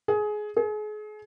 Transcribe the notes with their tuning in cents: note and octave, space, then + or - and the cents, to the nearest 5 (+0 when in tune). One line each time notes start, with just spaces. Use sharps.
G#4 +20
G#4 +35